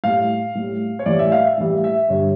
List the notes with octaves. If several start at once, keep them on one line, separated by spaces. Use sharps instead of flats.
A2 G3 F5
A2 G3
C#5
A2 E3 G3 D5
E5
F5
E5
A2 E3 G3 E5
E5
G2 D3 G3 C#5